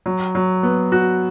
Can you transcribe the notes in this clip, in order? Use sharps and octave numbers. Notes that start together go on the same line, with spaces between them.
F#3
F#3
B3
F#4